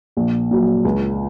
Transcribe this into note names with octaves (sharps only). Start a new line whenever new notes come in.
A#1
A#2 F#3
C#2